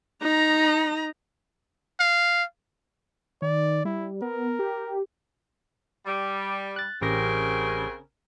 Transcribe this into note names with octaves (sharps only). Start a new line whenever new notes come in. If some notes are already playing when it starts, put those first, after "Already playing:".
D#4 A#5
F5
D#3 D5
G3 E4
B3 A#4
G4
G3
F#6 A6
A1 C#3 C4 G4 A#4 A#6